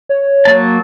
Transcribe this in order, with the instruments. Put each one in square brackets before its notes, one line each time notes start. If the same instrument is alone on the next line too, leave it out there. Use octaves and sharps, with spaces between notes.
[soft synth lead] C#5
[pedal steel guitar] F#3 A#3 A5